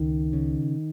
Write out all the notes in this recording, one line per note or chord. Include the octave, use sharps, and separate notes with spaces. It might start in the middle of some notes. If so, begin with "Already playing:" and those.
Already playing: C#2 D#3
C#3